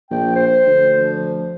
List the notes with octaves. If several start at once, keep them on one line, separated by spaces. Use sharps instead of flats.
A#1 G5
C5
D2
F3